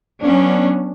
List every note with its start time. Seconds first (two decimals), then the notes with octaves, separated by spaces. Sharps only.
0.20 F#3 B3 C#4 D4